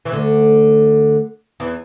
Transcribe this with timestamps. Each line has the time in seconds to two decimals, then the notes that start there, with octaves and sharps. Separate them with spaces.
0.05 E3
0.12 D2 D3
1.60 E2 E3